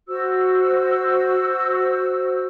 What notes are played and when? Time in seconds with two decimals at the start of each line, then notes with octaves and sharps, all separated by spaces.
0.08 F#4 C5 E6